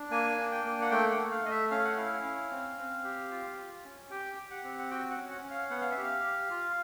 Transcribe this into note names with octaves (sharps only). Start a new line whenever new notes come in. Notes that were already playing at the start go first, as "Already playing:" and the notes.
Already playing: D4
A#3 G#5
D4
G5
A#3
F#5
A3 G5
F#5
A3
F5
A3 D#5
E5
C#4 F5
F#5
E4 F5
C#4
C4
C4
G4
F4
F4
C#4
G4 G5
G4
F#5
C4
F#5
F#4 G5
F#5
C#4
F#5
C#4
F5
B3 F#5
F5
E5
G4
F5
G4
F4